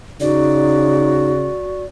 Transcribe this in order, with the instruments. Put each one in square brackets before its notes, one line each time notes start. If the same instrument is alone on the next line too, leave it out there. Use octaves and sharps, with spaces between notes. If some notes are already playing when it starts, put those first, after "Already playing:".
[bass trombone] C#3 [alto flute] D#4 [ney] F#4 [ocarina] D5